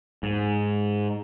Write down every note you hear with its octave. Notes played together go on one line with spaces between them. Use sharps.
G#2